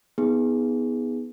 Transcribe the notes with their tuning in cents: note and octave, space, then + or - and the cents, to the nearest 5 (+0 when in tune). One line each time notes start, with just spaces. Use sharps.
B3 +0 D#4 +30 G#4 -5